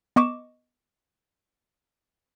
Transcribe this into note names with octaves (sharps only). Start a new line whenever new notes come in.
B3 D#5 C#6 D6 E7